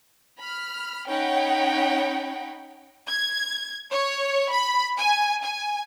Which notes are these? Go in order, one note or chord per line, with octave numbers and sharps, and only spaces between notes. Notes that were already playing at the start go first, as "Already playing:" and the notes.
B5 F6
C#4 D#4 C#5 F#5 G5 B5
G#6
C#5
B5
G#5
G#5